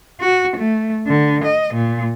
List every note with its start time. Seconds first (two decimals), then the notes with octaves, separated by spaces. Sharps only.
0.20 F#4
0.57 A3
1.07 D3
1.45 D#5
1.74 A#2